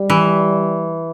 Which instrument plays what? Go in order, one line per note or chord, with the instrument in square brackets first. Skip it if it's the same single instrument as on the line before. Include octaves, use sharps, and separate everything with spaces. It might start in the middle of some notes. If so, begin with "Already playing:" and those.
Already playing: [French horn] G3
[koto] E3